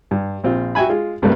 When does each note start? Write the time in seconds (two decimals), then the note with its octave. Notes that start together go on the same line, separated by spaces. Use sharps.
0.11 G2
0.44 A#1 C4 F4
0.75 F#4 E5 G5 G#5 B5
0.89 G#3 F4
1.22 C#2 G2 C3 A3 A#3 B4